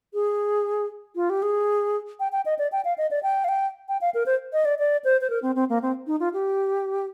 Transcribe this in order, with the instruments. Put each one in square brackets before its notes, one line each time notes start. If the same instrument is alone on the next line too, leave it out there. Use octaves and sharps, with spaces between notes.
[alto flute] G#4
F4
G4
G#4
G5
G5
D#5
D5
G5
F5
D#5
D5
G5
F5
G5
G5
F5
A#4
C5
D#5
D5
D5
C5
C5
A#4
C4
C4
A#3
C4
D#4
F4
G4